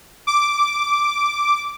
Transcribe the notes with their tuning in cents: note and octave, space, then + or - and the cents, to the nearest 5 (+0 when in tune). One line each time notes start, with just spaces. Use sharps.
D6 -5